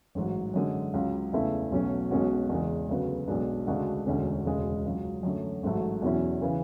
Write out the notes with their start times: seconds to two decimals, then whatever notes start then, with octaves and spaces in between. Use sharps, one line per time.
0.15 A1 G#2 F#3
0.54 F#2 D3 G#3
0.94 C#2 C#3 F#3
1.33 E2 C#3 E3 A3 E4
1.72 B1 B2 F#3 A3 C#4
2.11 B1 B2 G#3 C#4 F#4
2.49 E2 C#3 G#3
2.89 D2 C#3 F#3 B3
3.28 B1 B2 G#3 D4
3.67 D2 C#3 G#3 D4 F#4
4.06 E1 D2 D3 G#3 C#4
4.46 E1 D2 C#3 G#3
4.84 C#2 C#3 F#3
5.23 F#2 D3 F#3 A3
5.63 A1 G#2 F#3 A3
6.02 E2 B2 F#3 C#4 E4
6.42 C#3 E3